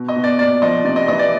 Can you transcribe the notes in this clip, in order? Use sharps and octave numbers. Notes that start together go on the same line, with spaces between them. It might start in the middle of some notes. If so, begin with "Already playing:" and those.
Already playing: B2
D#5
B2
D5
A#2 D5
F3 D#5
C3 D5
D#5
E3 D#5
D5